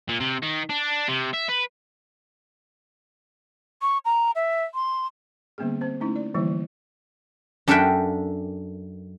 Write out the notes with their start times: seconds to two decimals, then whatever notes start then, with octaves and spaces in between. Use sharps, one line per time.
0.09 A#2
0.20 C3
0.42 D#3
0.69 D4
1.09 C3
1.34 E5
1.49 B4
3.82 C#6
4.05 A#5
4.36 E5
4.74 C6
5.58 D3 G3 A#3 B3 C#4 G#4
5.81 C4 C5
6.01 A3 C#4 D#4 E4
6.16 D5
6.34 D3 E3 F3 G3 A#3 E4
7.68 F#2 D4 A4 A#4 E5 G5